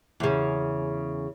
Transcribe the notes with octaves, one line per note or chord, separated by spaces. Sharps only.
E2 C#3